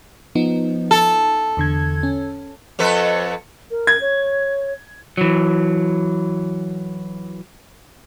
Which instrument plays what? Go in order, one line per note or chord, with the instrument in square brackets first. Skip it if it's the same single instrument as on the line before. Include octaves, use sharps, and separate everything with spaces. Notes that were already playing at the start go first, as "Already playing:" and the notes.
[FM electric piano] F3 B3 D#4
[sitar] A4
[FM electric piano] E2 D3 G#6
C#4
[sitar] F2 A4 B4
[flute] A#4
[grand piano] G#6
[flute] C#5
[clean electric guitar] E3 F#3